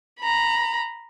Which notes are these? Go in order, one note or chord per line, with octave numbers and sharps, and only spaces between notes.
A#5 B5